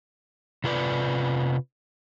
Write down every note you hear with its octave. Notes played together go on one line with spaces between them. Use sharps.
C3 F4 B4 D5